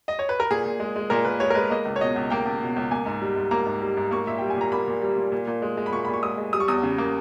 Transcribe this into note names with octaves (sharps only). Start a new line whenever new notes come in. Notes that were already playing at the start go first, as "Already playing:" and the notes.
D#5
C#5
B4
A#4
A#2 G#4
A#2
G#3
G#3
A#2 A#4
A#2 B4
G#3 C#5
A#4
G#3 B4
A#3 D#5
C#2
C#5
B2 D#5
C#2
A#3 G5
C#2
B2
C#2
A#3 G#5
G#2
G3
G#2
A#3 A#5
G#2
G3 A#5
G#2
A#3 C#6
A#2 E5
G3 G5
G#5
A#2 A#5
A#3 B5
A#2
G3
A#2
A#2
A#2
G#3
G#3
B5
A#2 C#6
A#2 B5
C#6
G#3 D#6
G#3
G3 D#6
C#6
E2 D#6
C#3
A#3